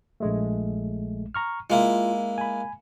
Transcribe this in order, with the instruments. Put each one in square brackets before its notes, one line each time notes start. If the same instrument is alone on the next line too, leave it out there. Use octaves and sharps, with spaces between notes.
[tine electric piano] A#1 G#3 A3
A#5 C#6 F6
[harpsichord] G#3 A#3 E4 [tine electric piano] F4
[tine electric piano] G#5 B5